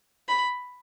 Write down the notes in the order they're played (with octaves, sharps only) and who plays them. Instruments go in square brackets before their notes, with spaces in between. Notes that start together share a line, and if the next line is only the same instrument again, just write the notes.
[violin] B5